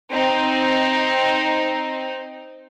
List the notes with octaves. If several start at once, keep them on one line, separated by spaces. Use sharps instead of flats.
C4 D#4